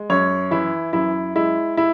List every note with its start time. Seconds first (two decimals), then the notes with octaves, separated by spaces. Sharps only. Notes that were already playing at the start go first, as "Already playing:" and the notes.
Already playing: G#3
0.10 F#2 C#5
0.51 E3 E4
0.93 F#2 E4
1.35 G#3 E4
1.77 E4